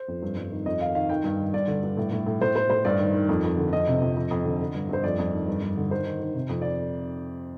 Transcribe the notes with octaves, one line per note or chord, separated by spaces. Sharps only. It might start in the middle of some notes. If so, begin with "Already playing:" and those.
Already playing: C5
F2
G2
G2
D#3
F2 D#5
D#3 F5
D#3 F5
D#3 G5
G2
D#3
G2 D5
D3
G2
A2
A2
A2
A2 C5
A2 C5
A2 C5
G2 D5
D#3
D#3
F2
F2
D3
F2 D#5
C3
F2
F2
F2
D3
D3
G2
G2 C5
F2 D5
F2
D#3
G2
G2
D3
D#3 C5
D#3
D#3
C3
F2
D5